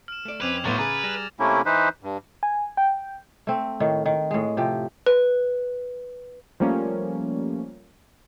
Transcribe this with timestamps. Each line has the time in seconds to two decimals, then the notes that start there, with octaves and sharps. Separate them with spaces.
0.08 F6 E7
0.25 A3 D5
0.41 F2 C4 C#4 B4 D6 G#6 F7
0.65 A2 F#3 B3 C5 D6 A6 D#7
0.79 C#3 G#4 B4 A#5 A6
1.04 G3 F6 A#6 E7
1.40 C3 A3 A#3 C#4 E4
1.66 E3 D#4 B4 C5
2.03 G2
2.43 G#5
2.77 G5
3.47 A3 C4
3.80 A2 D#3
4.06 D#3
4.31 A2 G#3
4.57 C3 F3 G4
5.06 B4
6.60 F3 G3 A3 A#3 C#4